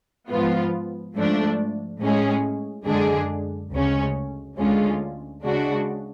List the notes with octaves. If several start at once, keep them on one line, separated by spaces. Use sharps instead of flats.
G#2 F3 B3 F4
G#2 F3 A3 D4
A2 G#3 C#4 G#4
F#2 D3 G#3 D4 G#4
D2 C#3 G#3 C#4
D2 D3 G#3 C#4 F4
C#3 G#3 D4 F#4